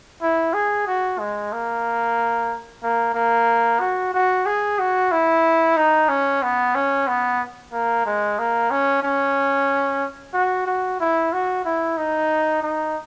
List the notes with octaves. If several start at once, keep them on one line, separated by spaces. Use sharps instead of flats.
E4
G#4
F#4
G#3
A#3
A#3
A#3
F#4
F#4
G#4
F#4
E4
D#4
C#4
B3
C#4
B3
A#3
G#3
A#3
C#4
C#4
F#4
F#4
E4
F#4
E4
D#4
D#4